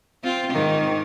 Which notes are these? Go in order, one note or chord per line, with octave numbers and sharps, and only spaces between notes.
C4 F4
G#2 D#3